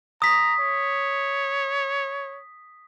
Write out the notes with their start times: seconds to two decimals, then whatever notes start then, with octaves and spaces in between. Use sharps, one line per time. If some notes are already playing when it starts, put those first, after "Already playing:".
0.22 A#5 D#6 B6
0.60 C#5